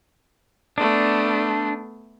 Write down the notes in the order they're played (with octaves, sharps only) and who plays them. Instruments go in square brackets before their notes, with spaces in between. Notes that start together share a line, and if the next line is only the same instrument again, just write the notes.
[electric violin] A3 B3 [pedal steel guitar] D4